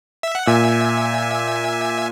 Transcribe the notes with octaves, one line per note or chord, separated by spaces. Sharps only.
E5
F#5
A#2 E5 G#5